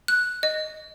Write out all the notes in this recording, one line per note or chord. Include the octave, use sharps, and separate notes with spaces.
F#6
D#5